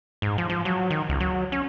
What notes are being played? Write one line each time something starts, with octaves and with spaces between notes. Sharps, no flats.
G#2
F3
F3
F#3
D#3
C#2
F#3
C#4